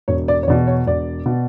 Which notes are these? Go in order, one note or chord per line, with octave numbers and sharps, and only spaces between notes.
E1 C#5
D5
C#5
E2 B2 D5
C#5
E1 D5
B2